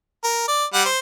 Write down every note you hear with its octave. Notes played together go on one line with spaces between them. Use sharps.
A#4
D5
G3 F#5
C5